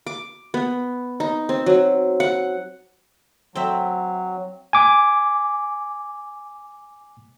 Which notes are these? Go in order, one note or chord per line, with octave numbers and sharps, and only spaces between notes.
D6
B3
D#4
C4
F#3
F#5
F#3 C4 E5
G#5 D6